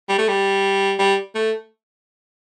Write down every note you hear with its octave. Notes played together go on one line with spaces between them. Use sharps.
G3
A3
G3
G3
A3